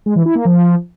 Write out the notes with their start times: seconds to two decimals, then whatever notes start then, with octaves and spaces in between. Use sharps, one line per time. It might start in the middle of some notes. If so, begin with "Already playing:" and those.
0.06 G#3
0.16 E3
0.26 E4
0.35 A#3
0.45 F3